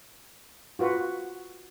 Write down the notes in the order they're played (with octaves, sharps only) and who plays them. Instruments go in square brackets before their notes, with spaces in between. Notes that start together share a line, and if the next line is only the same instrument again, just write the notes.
[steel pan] F4 F#4 B4